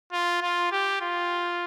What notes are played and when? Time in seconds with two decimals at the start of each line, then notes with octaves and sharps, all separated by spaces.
0.12 F4
0.42 F4
0.72 G4
1.02 F4